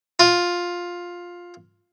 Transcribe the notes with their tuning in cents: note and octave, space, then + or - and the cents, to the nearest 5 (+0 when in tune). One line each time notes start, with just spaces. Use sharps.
F4 +10